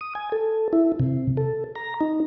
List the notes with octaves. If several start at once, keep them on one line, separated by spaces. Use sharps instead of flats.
D#6
G#5
A4
E4
C3
A4
A#5
D#4